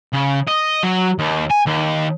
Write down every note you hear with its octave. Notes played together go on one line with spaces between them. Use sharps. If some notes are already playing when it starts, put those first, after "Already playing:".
C#3
D#5
F#3
D#2
G#5
D#2